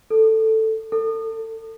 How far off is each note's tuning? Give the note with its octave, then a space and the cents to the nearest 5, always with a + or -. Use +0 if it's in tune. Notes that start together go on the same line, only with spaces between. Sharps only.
A4 +5
A4 +30